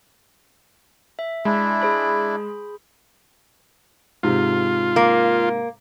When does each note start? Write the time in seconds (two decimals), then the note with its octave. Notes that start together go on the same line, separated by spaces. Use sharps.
1.19 E5
1.45 G#3 D4 E4
1.82 G#4 C5 B5
4.23 G#2 C3 F4
4.96 A#3